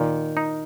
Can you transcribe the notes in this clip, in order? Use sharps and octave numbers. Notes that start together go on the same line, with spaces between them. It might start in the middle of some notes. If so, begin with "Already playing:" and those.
Already playing: A#2 D#3
D#4